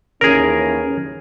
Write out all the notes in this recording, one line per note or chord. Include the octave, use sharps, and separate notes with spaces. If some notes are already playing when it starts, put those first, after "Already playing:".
D#2 E3 C#4 G#4 A#4